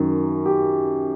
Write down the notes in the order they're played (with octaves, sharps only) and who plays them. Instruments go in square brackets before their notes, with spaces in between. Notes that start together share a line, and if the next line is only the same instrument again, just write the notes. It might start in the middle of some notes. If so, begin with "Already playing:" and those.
Already playing: [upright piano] F#2 D#3
G4